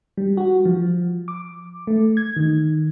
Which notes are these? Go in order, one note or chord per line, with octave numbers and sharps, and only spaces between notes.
G3
F#4
F3
D6
A3
G#6
D#3